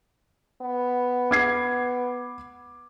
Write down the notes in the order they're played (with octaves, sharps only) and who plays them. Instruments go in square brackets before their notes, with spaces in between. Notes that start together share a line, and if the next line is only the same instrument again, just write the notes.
[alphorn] B3
[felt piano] D6 G#6 C7